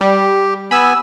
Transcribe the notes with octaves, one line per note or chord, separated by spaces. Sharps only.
G3 G4
B3 G#5 B5 E6